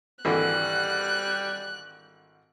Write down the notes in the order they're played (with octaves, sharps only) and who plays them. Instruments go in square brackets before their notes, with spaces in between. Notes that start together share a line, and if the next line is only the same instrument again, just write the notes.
[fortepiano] G#1 D3 E3 [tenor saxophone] G3 [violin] F#6